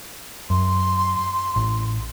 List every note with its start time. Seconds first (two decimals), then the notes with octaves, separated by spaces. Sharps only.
0.50 F#2 C6
1.56 A1